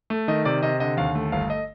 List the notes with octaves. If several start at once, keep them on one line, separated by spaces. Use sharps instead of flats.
A3
D#3 D#5
C3 D5
C3 D#5
D3 D#5
D#2 F5
A3
G1 F5
D#5